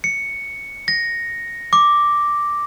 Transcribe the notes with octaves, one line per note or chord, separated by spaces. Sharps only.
C#7
A#6
D6